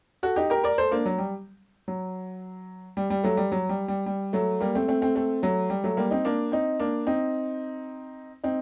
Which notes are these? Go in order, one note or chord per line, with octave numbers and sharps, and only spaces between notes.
F#4 A4
D#4 G4
G4 A#4
A#4 D5
A4 C5
A#3 D4
F#3
G3
F#3
G3
G3
F#3 A3
G3
F#3
G3
G3
G3
F#3 A3
G3 A#3
A3 C4
A3 C4
A3 C4
A3 C4
F#3 A3
G3
F#3 A3
G3 A#3
C4 D#4
A#3 D4
C4 D#4
A#3 D4
C4 D#4
C4 D#4